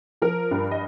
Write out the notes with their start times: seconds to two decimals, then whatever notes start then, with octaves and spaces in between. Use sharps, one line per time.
0.22 F3 A#4
0.51 G2
0.71 D#5